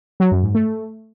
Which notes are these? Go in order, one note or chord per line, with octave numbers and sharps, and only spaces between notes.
F#3
F#2
G#2
A3